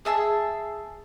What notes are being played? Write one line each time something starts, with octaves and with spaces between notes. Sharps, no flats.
G#4 E5 A5